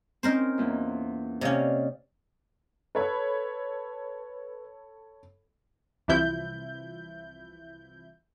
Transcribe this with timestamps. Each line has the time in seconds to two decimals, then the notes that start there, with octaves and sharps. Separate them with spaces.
0.23 C4 C#4 D#4 A#4 C5
0.58 E2 A#2
1.41 C3 C#4 D5 D#5 F5
2.95 A4 B4 C#5 B5
6.08 C2 E3 F3 E4 G6